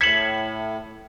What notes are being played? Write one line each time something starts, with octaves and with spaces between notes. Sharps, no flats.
A2 G#6 B6 C#7 E7 F#7